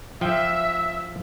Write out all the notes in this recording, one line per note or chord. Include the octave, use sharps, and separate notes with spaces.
F3 E5 G5